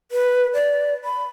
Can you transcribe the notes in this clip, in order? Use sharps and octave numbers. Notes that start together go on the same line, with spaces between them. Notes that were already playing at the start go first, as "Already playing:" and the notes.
B4
D5
B5